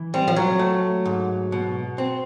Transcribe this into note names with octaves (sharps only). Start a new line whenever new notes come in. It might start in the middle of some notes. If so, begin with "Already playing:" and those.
Already playing: E3
G3 C4
F3
F#3
A3
G#2
B2
C4